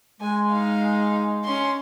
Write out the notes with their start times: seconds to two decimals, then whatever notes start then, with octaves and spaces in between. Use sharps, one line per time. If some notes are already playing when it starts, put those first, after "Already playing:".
0.21 G#3 G#5
0.50 D#4 F5
1.45 C#4 C6